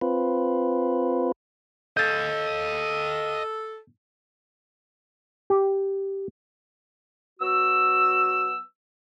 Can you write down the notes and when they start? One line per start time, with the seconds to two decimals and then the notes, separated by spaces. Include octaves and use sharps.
0.01 C4 F4 B4
1.97 A4 D#5 F5 G6 A6
5.50 G4
7.40 F#3 B3 F#4 E6